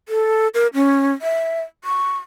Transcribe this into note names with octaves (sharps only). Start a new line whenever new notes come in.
A4
A#4
C#4
E5
C#6